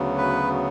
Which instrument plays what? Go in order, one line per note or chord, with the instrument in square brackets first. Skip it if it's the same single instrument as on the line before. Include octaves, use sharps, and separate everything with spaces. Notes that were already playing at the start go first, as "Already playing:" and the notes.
Already playing: [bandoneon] D2 C#3 F#3 B3
B4